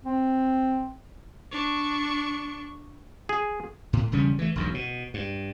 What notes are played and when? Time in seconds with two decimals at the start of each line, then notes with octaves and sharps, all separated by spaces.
0.05 C4
1.52 D4 C#6
3.29 G#4
3.93 A2
4.12 E1 C#3 G3 C#4
4.39 E3 A3
4.56 E1 B1 F#2
4.74 B2
5.14 G2